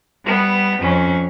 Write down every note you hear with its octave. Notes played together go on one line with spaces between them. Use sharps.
G3 B3
F2 C#4